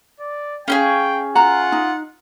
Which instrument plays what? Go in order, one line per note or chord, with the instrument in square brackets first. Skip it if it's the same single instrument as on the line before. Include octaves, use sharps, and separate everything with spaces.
[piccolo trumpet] D5
[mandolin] C#4 G4 G#4 [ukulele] F5 [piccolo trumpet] G5
[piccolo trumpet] F4 [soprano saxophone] F#5 [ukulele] A#5
[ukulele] D#4